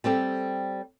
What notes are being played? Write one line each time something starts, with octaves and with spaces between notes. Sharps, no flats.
G3 C4 G4 A4